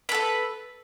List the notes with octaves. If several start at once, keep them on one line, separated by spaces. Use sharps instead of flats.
A4 B4 B5